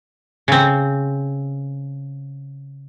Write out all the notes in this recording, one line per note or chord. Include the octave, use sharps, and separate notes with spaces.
C#3 C4